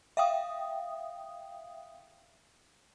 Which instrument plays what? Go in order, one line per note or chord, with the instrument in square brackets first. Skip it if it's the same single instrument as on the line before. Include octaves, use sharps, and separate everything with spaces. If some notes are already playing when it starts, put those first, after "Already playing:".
[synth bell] E5 F5 G5 D#6